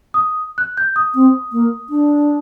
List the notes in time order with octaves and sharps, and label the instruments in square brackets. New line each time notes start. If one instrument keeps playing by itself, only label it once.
[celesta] D#6
F#6
G6
D#6
[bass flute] C4
A#3
D4